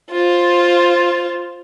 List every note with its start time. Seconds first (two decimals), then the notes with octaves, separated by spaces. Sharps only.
0.11 F4 C5